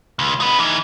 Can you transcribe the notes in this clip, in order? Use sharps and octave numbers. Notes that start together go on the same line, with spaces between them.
C#2
D#4 B4
E3 D#4